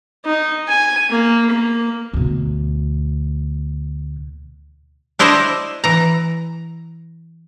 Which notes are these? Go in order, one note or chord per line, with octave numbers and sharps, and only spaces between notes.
D#4
G#5
A#3
A#3
D2 B2
D4 E4 C5 D5 D#5 A5
E3 A#5